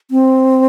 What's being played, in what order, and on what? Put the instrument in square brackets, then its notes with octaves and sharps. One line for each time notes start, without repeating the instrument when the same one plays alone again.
[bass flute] C4